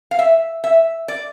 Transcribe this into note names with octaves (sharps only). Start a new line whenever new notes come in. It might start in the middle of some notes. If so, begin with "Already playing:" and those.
F5
E5
E5
D5